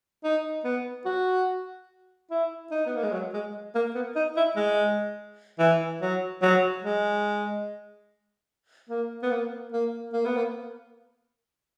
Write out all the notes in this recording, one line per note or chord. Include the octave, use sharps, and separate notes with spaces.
D#4
B3
F#4
E4
D#4
B3
A#3
G#3
F#3
G#3
A#3
B3
D#4
E4
G#3
E3
F#3
F#3
G#3
A#3
B3
A#3
A#3
A#3
B3
A#3